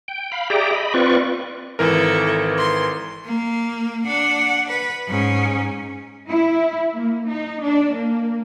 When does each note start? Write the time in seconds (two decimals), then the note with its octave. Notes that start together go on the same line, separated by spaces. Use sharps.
0.08 G5
0.32 F5 B5
0.50 G4 G#4 D5 E5 G5 A#5
0.73 D#5 B5
0.94 C4 F4 B4 D5 C#6
1.79 G#1 E3 E4 A4 A#4
2.58 C6
3.25 A#3
4.07 D4 F#5
4.69 B4
5.08 G#2 C#4
6.29 E4
6.93 A#3
7.28 D#4
7.62 D4
7.94 A#3